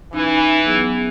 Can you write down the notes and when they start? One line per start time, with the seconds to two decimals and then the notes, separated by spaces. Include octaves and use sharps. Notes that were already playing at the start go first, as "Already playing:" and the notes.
0.13 E3 C#4 D#4
0.66 F#3 B3 G#4